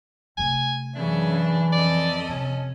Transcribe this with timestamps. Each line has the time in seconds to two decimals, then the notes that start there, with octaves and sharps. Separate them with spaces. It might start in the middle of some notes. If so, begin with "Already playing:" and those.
0.38 C3 A3 G#5
0.95 F#2 C#3 E3 D4 E5
1.72 F2 A4 D5 D#5
2.29 C3 C#4